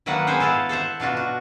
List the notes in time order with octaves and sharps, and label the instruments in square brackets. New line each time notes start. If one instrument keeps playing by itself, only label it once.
[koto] D#3 F#3 A#3 D4 B4 F#5
B3 G#4 B4 C5 F#5 G5
E4 A4 F5 F#5
A4 C5 E5 F#5
B2 D4 F4 F#4
F#4